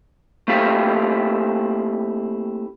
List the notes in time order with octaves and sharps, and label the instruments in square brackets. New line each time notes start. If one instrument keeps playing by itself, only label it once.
[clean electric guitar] A3 A#3 C4 E4 G4 F5